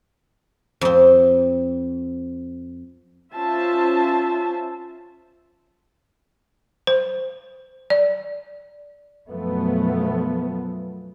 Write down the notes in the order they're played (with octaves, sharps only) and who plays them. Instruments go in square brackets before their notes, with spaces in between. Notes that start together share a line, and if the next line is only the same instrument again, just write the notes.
[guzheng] F2 C4
[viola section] C#4 F4 C5 E5 A5
[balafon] C5
D5
[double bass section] F#2 B2 F3 A3 B3